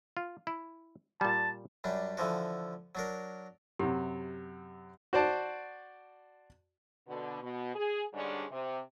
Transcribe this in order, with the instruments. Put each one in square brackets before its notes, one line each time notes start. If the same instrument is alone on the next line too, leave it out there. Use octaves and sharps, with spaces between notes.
[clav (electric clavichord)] F4
E4
[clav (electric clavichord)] A#2 G3 [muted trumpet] A5
[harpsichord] F#2 G3 D4
D3 E3 F3 F#4
F#3 D4 A#4
[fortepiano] F#2 C3 [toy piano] G4
[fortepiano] F#4 C5 D5 A5
[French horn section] B2 D3
B2
G#4
G#2 D3 G3 G#3 C#4 D4
C3